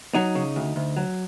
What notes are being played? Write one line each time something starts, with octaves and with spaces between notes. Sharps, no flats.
F#3 D#4
C#3
D2
D2
F#3